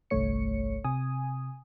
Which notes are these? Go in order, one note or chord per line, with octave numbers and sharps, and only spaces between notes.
G1 C2 G2 A3 C#5 C#7
C3 G#5 D#6